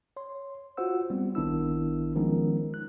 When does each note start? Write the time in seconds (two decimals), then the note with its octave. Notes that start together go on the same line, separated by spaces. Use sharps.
0.17 C#5 C6
0.77 F4 F#4 C5 F#5 E6
1.10 G3 B3 C4
1.35 A1 D#3 B3 D4 E4 E6
2.15 D#3 F3 G#3 B3 C#4 D#4
2.74 F#6